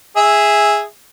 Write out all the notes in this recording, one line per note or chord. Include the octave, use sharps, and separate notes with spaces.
G#4 E5